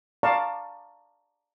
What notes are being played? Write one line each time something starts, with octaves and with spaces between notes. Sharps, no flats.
D5 F5 A5 A#5 C#6